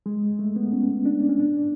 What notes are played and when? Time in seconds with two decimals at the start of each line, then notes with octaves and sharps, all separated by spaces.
0.06 G#3
0.39 A3
0.56 B3
0.72 C#4
1.05 D4
1.29 C#4
1.40 D4